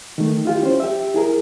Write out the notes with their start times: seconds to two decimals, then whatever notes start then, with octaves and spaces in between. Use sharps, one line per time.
0.18 D#3 A3
0.45 E4 F4 G4
0.63 C#4 C5
0.80 G4 E5
1.14 E4 G#4 A#4